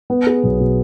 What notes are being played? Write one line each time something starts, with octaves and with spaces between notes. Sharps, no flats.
B3
G#4
B1
B2